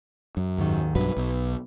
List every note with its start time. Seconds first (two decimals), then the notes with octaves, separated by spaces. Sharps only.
0.37 F#2
0.57 D#2 G#2 D#3
0.95 B1 G2 F#3 B4
1.17 B1